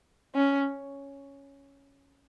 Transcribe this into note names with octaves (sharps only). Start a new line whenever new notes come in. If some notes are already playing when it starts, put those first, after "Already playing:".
C#4